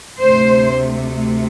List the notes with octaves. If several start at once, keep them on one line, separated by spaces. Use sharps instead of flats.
D2 C3 A3 C5